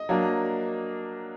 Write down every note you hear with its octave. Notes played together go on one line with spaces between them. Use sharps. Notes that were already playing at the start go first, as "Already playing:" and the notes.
Already playing: D#5
F#3 A#3 D4